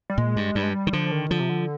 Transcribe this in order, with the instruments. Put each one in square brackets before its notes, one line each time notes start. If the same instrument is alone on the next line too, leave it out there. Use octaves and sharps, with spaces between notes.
[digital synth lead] G3
[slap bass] A#2 [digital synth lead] G#3
[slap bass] G2
[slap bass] G2 [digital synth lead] G3
[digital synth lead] G#3
G3
[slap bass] D#3
[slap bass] D3 [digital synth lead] F3
[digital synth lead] D#3
[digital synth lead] D3 [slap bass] F3
[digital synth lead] C3
D3